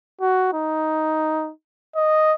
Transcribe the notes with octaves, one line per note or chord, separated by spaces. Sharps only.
F#4
D#4
D#5